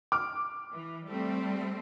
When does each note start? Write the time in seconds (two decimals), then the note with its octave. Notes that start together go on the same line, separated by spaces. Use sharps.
0.12 D6 F6
0.70 E3
1.06 G3 A3 C4